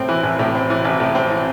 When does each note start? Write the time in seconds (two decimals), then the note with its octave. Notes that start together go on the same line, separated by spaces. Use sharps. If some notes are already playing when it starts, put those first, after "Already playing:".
Already playing: A2 C4
0.09 E3
0.23 A1
0.39 A2
0.55 C4
0.70 E3
0.85 A1
1.00 A2
1.15 C4
1.31 E3